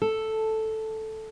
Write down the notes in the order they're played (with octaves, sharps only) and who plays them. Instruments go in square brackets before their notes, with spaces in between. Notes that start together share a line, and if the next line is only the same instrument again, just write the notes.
[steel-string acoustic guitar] A4